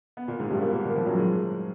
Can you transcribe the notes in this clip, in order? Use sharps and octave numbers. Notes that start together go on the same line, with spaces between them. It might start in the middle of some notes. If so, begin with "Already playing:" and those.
B3
A#2 A#3
G#2 G#3
G2 G3
B3
A#2 A#3
A#2 A#3
A#2 A#3
F2 F3
F#2 F#3
G#2 G#3